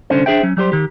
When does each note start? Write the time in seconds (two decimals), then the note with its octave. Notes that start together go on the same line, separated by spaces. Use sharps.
0.10 C2 D3 C#4 C5
0.26 D4 G#4 C5 E5 G5
0.43 F#3 C#4
0.57 F#3 G3 G4 C5
0.72 D#3 G4